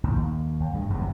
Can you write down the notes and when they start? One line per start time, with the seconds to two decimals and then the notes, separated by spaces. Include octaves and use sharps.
0.04 A#1 D#2 G#2
0.17 D#2
0.60 D#2
0.73 G2 F#3 G#3
0.90 G1 E2 G2 C3